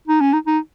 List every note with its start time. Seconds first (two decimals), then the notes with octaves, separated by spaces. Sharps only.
0.08 D#4
0.21 C#4
0.33 D#4
0.47 D#4